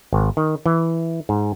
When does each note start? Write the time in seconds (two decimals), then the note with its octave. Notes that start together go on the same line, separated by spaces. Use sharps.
0.13 G#1
0.37 D#3
0.66 E3
1.29 G#2